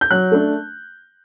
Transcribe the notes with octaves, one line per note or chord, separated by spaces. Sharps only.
G6
F#3 F#6
A3 D4